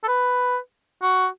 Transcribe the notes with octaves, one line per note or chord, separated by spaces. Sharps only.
A4
B4
F#4